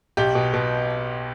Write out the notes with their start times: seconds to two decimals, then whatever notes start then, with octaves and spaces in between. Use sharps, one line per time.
0.17 B1 G4 G5
0.35 B2
0.54 B2